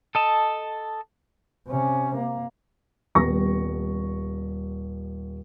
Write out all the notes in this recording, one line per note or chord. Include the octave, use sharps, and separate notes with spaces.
A4 D#5 A5
C3 C#4
A#3
D#1 G3 B3 C#6 A#6